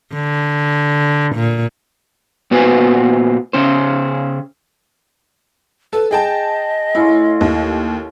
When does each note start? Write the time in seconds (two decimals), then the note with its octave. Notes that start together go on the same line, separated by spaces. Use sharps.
0.13 D3
1.36 A#2
2.51 A#2 B3 F#4 B4 C5 G#5
3.53 C#3 C#4 C5
5.93 A4 B4
6.11 G#4 D#5 G5 A5
6.95 A2 C#4 E4 F4
7.41 D#2